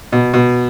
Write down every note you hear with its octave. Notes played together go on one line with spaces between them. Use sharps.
B2
B2